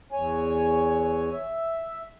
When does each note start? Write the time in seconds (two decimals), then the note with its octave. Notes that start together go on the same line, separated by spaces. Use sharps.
0.12 E2 C#5 G#5
1.32 E5